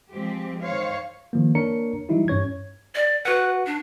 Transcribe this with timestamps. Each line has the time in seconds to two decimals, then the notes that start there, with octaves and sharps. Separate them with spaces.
0.10 F3 G#3 C4 G4
0.62 D#3 C5 C#5 F5
1.33 D#3 F3 A#3
1.55 A#3 D4 A#4 C#5 A#5 C#7
2.09 E3 F#3 G3 D#4 E4 G4
2.28 G2 C#4 C#5 G#6
2.95 D5
3.25 F#4 B4 F#5
3.66 D4